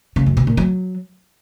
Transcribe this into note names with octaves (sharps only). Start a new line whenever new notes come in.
C#3
F#2
B2
A#2
F#3